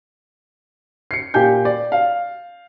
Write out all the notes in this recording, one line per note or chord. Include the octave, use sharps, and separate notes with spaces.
C7 C#7
A#2 G4 G5 G#5 G6
D5
F5